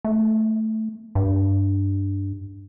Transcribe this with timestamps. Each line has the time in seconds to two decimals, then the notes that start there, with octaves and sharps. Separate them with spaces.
0.05 A3
1.15 G2